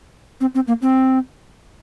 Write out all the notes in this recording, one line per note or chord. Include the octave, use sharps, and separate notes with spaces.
C4
C4
A#3
C4